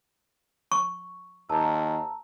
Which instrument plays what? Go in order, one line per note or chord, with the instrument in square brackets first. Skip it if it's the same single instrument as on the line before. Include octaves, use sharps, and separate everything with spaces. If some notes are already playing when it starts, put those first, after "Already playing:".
[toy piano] C#6
[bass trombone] D#2 [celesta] A5 A#5 E6